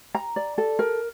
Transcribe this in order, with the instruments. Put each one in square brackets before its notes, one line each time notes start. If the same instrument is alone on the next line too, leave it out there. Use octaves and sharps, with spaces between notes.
[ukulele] A#5
D5
A4
A#4